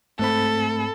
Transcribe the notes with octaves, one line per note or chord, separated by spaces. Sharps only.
G#2 A3 C4 A4 B5